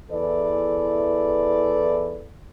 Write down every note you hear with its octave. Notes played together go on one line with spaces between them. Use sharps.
E2 E3 A4 B4 D5